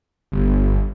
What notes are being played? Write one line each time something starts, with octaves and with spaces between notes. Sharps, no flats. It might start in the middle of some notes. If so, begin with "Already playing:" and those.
G1